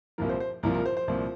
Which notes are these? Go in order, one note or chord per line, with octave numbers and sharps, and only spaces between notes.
C2 A#2 F3 A#4
C5
C5
C2 A#2 F3 A#4
A#4
C5
C5
C2 A#2 F3